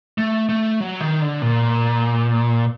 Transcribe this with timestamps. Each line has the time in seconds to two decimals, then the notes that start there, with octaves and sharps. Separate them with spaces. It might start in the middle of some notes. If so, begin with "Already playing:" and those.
0.18 A3
0.49 A3
0.80 F#3
1.01 D#3
1.22 D3
1.42 A#2